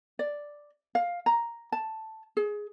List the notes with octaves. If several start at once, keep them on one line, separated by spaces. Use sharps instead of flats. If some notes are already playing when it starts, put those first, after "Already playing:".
D5
F5
A#5
A5
G#4